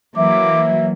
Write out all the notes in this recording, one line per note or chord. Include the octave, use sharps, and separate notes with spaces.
E3 F#3 A#3 E5 D6